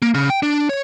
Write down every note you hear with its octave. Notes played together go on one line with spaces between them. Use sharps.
A#3
C#3
G5
D4
C#5